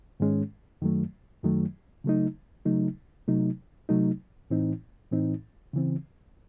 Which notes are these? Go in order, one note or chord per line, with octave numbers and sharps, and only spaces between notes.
G#2 D#3 G#3 C#4
F#2 D#3 F#3 A3
F#2 D#3 F#3 A3
C#3 F#3 A3 D#4
C#3 F#3 A3 D#4
C3 F#3 A3 D#4
C3 F#3 A3 D#4
A2 E3 C4 D#4
A2 E3 C4 D#4
C#3 E3 C4